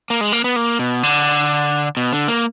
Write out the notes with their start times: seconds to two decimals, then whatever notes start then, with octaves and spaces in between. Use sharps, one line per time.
0.10 A#3
0.21 G#3
0.32 A#3
0.44 B3
0.56 A#3
0.79 B2
1.03 D3
1.97 B2
2.13 D3
2.28 A#3